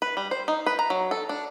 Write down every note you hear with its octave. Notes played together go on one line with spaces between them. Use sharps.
B4
G3
C5
D#4
B4
A#5
F#3
A4
D4